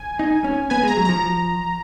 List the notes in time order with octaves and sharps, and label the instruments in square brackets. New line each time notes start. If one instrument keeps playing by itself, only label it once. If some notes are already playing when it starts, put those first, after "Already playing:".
Already playing: [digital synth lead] G#5
[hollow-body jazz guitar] D#4
C#4
[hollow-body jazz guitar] B3 [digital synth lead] G#5
[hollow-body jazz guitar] G#3
[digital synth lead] A#5
[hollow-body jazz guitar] F#3
[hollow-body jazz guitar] F3 [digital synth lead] A#5